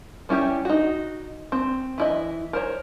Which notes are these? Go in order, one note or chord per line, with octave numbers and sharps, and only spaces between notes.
G3 C#4 E4 G4
D#4 F#4
C4
E3 E4 D#5
A#4 C5 C#5